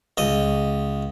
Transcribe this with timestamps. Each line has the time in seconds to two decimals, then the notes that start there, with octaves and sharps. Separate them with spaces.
0.17 C#2 D#5